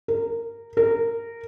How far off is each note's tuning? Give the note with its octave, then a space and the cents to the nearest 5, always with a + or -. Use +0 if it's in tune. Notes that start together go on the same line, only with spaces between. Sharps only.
A#4 -15
A#4 -15